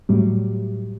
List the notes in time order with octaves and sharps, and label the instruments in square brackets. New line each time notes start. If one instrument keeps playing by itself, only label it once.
[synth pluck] A2 F#3 G3